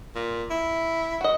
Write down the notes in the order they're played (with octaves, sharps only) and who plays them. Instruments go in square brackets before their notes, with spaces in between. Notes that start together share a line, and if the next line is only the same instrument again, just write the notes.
[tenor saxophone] A#2
E4
[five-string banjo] F#4 D#5